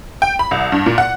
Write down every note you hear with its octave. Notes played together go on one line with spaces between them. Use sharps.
G5
B5
C2
G2
A#2
F#5